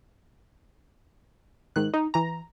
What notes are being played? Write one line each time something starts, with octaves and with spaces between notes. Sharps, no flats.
G#2 D#3 F#6
D#4
E3 A#5